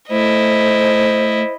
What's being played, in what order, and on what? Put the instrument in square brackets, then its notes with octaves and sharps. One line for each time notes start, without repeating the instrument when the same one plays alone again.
[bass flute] A3 [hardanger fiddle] E4 D#5 [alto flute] C5